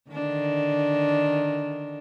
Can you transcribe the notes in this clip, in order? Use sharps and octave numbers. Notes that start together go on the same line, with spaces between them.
D3 D#3 D4